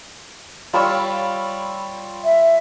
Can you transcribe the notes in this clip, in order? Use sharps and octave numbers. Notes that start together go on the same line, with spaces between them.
G3 F4 C#5 B5 E6
E5